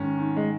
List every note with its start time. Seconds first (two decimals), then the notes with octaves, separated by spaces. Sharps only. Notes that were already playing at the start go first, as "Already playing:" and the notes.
Already playing: G#2 D#3 C#4
0.18 D#3
0.36 G#3